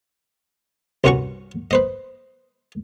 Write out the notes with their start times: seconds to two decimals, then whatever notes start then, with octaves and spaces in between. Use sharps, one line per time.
1.04 C2 G2 C#4 F#4 F#5 C#6
1.71 B4 C5 D#5